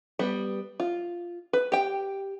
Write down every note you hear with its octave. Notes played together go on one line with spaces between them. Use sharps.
G3 B3
F4
B4
G4 G5